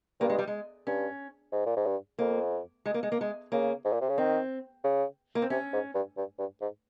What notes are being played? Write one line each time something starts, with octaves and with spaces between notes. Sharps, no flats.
G2 A#3
G#3
G3
G#3
G2 C#4
G#2
A#2
G#2
G2
F2 A#3
G#3
A#3
G#3
A#3
G#3
C#3 A#3
G#2
A#2
C3
C#3
D#3 C4
C#3
A#3
C4
C3 C#4
G#2
G2
G2
G2
G#2